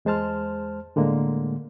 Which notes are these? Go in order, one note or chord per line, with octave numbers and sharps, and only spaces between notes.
E2 G#3 C5 A5 F6
A2 D3 G#3 A#3